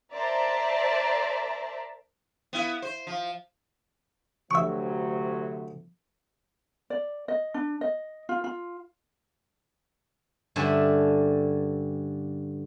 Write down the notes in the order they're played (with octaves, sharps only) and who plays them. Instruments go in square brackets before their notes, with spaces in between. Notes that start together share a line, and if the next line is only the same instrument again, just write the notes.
[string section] A#4 C5 D5 E5 A5 A#5
[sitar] B3 E4
C5
F3
[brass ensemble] D2 C3 F#3 [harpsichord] E5 C#6
[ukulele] D5
D#5
D4
D#5
F4
F4
[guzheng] G2 D3 C#4 D4 A4 E5